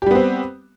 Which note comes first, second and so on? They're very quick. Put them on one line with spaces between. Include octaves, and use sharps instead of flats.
G4 G3 B3 C4